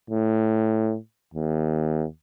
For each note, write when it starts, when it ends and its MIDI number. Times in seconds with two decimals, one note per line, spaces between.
0.10 0.96 45
1.34 2.05 39